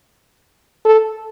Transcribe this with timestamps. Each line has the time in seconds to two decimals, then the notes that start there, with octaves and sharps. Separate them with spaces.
0.85 A4